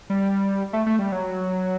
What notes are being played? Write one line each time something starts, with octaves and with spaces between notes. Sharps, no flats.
G3
A3
A3
G3
F#3